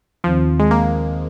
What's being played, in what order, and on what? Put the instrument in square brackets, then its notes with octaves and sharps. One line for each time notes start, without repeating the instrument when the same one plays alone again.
[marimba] D#2 D#3 C4 [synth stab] F3
[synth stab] G#3
A#3